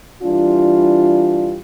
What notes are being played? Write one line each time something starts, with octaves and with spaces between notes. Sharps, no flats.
E3 G3 D4 F4